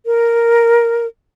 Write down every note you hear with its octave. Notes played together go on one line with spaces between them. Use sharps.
A#4